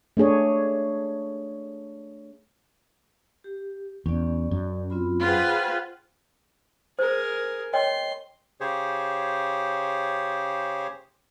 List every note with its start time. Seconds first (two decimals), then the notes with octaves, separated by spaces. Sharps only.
0.17 A3 D4 G#4 C#5
3.44 G4
4.06 E2 C#4 D5
4.51 F#2
4.90 C4 F4 B5
5.23 F4 G#4 B4 C5 F#5 G5
6.99 G#4 A#4 C5
7.74 C#5 D#5 G5 C6
8.61 C#3 G4 G#4 C5 C#5